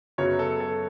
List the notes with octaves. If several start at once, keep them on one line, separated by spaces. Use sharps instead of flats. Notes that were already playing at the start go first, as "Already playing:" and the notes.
F#2 C#3 F#3 B3 C#5
A4
A4